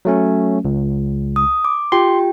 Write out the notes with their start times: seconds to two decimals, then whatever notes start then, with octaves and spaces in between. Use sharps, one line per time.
0.05 F#3 A3 C#4
0.65 C#2
1.36 D#6
1.65 D6
1.92 F4 G4 G5 C6